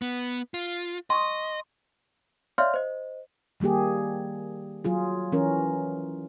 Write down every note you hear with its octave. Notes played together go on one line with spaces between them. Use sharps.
B3
F4
D#5 C6 C#6 D#6
C#5 D5 E5 F5 C6 F6
C5 D#5
D#3 G3 A#3 G4 G#4
F#3 F4 G#4
E3 C#4 A#4